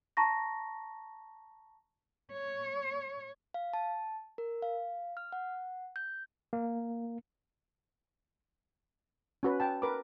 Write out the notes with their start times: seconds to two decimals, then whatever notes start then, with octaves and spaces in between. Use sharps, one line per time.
0.17 A5 A#5 C#6 A#6
2.33 C#5
3.54 F5
3.74 A5
4.38 A#4
4.62 F5
5.17 F6
5.32 F#5
5.96 G6
6.53 A#3
9.43 C#4 F#4 B4
9.60 G5 A5
9.82 A#4 B4 B5 D6